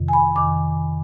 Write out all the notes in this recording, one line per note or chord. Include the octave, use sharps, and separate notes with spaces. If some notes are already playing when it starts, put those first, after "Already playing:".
Already playing: F2 C3 D#3
G#5
B5
F2 D#3 D6